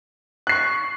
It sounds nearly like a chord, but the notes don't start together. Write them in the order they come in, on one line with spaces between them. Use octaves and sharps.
F#6 C7 C#6